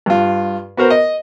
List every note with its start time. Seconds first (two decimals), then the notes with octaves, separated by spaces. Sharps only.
0.06 G2 F4
0.77 B3 F#4 A#4 C5
0.90 D#5